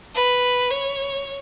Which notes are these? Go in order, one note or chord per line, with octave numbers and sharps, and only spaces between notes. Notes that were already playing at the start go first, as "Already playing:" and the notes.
B4
C#5